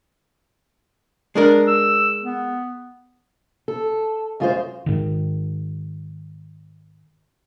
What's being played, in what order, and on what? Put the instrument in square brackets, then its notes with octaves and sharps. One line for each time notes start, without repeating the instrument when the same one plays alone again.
[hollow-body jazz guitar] G#3 D4 A#4
[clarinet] E6
B3
[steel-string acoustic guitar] A4
F#2 G#3 F4 F#4 A#4 C5
[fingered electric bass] G#2 D#3